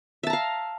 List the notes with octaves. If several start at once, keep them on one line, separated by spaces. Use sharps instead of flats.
E5 F5 A5 A#5